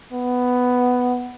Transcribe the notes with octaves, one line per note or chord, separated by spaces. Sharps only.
B3